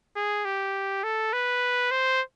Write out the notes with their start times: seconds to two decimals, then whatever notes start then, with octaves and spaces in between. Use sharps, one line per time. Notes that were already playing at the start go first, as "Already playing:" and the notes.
0.16 G#4
0.45 G4
1.04 A4
1.33 B4
1.91 C5